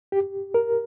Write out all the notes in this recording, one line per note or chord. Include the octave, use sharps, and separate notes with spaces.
G4
A#4